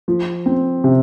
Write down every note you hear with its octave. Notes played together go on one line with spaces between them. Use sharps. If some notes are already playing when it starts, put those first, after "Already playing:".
F3
C4
C3